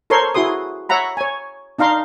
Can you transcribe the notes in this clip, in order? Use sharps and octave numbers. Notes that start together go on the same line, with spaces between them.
A4 A#4 C5 C#5 C6
E4 F#4 G#4 C6 D#6
C#5 E5 F#5 A#5 B5
C#5 G#5
D4 D#4 F5 A#5 C6